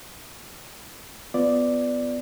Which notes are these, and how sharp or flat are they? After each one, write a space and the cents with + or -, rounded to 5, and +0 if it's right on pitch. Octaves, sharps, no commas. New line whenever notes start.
B3 +25 F4 +0 D5 +0